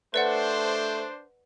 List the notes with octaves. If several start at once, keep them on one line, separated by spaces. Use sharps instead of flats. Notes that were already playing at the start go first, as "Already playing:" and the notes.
A3 D4 B4 C5 D5 F#5